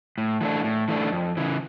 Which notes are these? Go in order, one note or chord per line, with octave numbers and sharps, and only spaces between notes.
A2
E3 A3 D4
A2
E3 A3 D4
F2
C#3 E3